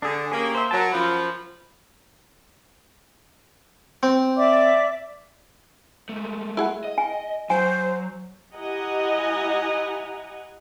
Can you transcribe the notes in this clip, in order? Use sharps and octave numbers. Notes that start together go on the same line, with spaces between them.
D3 D4 G#4
A#3 C#4 G4 G#4
C5 E5
F#3 A#4 A5
F#2 F3 B5
C4
D5 E5 D6
G#3 A3
E4 G#4 F#5
D#5
G#5
F#3 C5 G#5
E4 G4 D#5 F#5 G#5 A#5